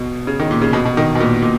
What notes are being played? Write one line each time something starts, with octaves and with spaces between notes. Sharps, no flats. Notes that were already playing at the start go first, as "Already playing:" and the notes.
Already playing: B2
C#3
D#3
A#2
C#3
B2
B2
D#3
B2
A#2
A#2